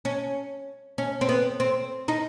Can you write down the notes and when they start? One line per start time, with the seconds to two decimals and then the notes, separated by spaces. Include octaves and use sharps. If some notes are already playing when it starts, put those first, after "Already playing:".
0.05 C#4
0.98 C#4
1.21 C4
1.29 B3
1.60 C4
2.08 D#4